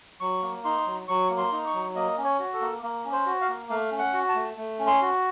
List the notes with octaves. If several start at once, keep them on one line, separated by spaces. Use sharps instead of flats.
F#3 C#6
A#3
D#4 C6
F#3
F#3 C#6
A#3
C6
D#4
C#6
F#3
A#3 D#5
C#4
C#5
F#4
A4
A#3
A#3
C#4
C5
F#4
F5
A#3
A3 F5
C#4
F#5
F#4
A5
A3
A3
C#4
C6
F#4